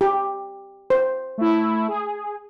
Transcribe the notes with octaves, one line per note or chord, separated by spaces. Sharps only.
G4
C5
A3 E4
G#4